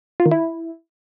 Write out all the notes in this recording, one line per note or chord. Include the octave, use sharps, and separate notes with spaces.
F4
D#3
E4